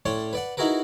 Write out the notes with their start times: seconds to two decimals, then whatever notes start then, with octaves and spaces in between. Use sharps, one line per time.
0.06 A2 C#4 C#5 D5 C6
0.33 B4 D5 F#5
0.57 D#4 E4 F#4 G#4 A#4 B4